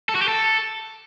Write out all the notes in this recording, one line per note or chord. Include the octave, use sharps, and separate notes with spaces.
A4
F#4
G4
A4